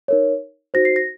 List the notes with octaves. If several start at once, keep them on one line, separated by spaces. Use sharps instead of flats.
D#4 A#4 C#5
D#4 F#4 C5 A#6
C7
A#6